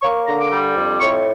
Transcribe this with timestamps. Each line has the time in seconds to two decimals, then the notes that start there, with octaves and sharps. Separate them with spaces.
0.02 A#3 C#6
0.27 D3 A#5
0.39 D6
0.51 G3
0.76 F2
1.00 A2 C#6